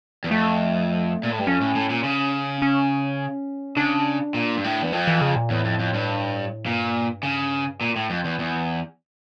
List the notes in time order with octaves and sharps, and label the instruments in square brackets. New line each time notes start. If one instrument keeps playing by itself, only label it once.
[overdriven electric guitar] E2
[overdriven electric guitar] F2 [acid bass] A3
[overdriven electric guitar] A#2
A2
G2
[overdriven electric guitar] F2 [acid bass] C#4
[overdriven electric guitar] A2
A2
A#2
C#3
[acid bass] C#4
[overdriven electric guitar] C#3 [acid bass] D4
[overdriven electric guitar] A#2
G2
A2
E2
[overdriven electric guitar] F2 [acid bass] F3
[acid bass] E3
C#3
A#2
[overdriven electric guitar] E2 [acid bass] A2
[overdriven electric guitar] F2
F2
G2
[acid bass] G2 [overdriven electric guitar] A#2
[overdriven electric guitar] C#3
A#2
A2
F2
E2
E2